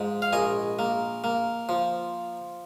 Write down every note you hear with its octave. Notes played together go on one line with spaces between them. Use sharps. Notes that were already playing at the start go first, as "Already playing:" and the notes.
Already playing: G#2 F3
F5
A#1 D#5 G#5
A#3
A#3
F3